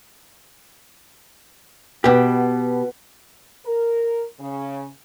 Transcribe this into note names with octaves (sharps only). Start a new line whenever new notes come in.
B2 G4 B4 F#5
A#4
C#3